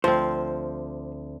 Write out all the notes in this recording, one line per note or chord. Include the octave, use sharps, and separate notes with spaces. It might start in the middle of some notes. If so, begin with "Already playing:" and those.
D2 F3 C4 C5